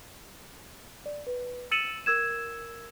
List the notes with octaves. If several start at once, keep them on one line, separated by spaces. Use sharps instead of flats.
D5
B4
E6 A6 C#7 D#7 E7 F#7
A#4 E6 G#6 E7